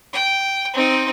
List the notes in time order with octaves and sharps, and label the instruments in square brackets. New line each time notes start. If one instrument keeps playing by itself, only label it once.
[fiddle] G5
C4 D#4